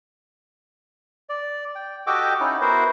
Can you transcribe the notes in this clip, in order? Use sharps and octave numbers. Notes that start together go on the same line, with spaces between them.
D5
G5
F#4 G4 A4 D#5 G5 D6
C#4 D#4 E4
B3 E4 F#4 A#4 C5